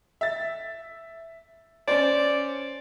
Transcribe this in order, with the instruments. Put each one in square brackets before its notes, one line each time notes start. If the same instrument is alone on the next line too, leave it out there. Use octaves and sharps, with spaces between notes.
[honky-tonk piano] E5 A6
[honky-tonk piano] C#4 C5 [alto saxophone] D5